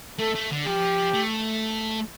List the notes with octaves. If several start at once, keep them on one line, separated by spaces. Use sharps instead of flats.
A3 A4
A3
D3
F3 G4
A3